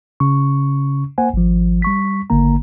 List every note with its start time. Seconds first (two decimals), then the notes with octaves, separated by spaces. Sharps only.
0.20 C#3 C#4 C#6
1.18 A#3 C5 F#5 G#5
1.34 G#1 F3
1.82 G3 C#6 B6
2.30 G#1 D3 A#3 A#5